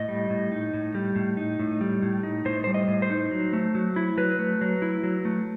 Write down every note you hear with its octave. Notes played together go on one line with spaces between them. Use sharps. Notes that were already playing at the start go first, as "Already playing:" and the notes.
Already playing: A2 D#5
G3
A2
D#4
A2
G3
A2
D#4
A2
G3
A2
D#4
A2 C5
G3 C5
D#5
A2
C5
D#4
F#3
A3
F#3
E4
F#3 B4
A3
F#3
E4
F#3
A3